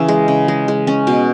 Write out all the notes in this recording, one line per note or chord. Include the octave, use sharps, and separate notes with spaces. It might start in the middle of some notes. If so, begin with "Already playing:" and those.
Already playing: C#3 E3 C#4 E5
G#3
C#3
G#3
G#3
C#4
B2